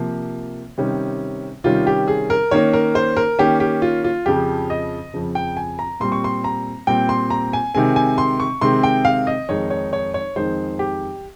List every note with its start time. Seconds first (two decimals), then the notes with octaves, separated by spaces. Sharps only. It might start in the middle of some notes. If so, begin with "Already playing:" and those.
Already playing: C3 F3 A#3
0.78 C3 D#3 G3 C#4
1.64 C3 D#3 G3 C#4 F4
1.87 G4
2.08 G#4
2.30 A#4
2.51 D#3 A#3 C#4 C#5
2.73 A#4
2.95 C5
3.17 A#4
3.39 D#3 A#3 C#4 G4
3.60 G4
3.82 F4
4.04 F4
4.26 F2 C#3 F3 G4
4.70 D#5
5.14 F2 C#3 F3
5.35 G5
5.57 G#5
5.79 A#5
6.00 A#2 G3 C4 C6
6.12 C#6
6.24 C6
6.44 A#5
6.87 A#2 G3 C4 G5
7.09 C6
7.30 A#5
7.53 G#5
7.75 C3 D#3 G#3 C4 G#5
7.96 G#5
8.18 C6
8.40 C#6
8.61 C3 D#3 G#3 C4 C6
8.83 G5
9.05 F5
9.27 D#5
9.49 F2 D#3 G#3 D#4 C#5
9.70 C#5
9.93 C#5
10.14 C#5
10.36 F2 D#3 G#3 D#4 C5
10.79 G4